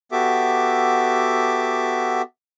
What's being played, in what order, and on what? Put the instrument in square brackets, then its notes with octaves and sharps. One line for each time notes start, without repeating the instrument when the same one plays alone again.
[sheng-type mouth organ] B3 F#4 G4 A4 E5 D6